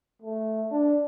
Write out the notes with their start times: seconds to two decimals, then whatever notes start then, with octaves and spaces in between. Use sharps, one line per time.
0.22 A3
0.72 D4